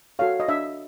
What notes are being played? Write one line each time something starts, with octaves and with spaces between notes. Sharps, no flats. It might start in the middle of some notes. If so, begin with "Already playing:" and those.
F#4 A4 C#5 F5
D#5
D4 E5